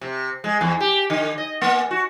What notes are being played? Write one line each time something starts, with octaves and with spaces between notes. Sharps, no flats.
C3
G#3
E2
G4
D3
D#5
A#3
F#4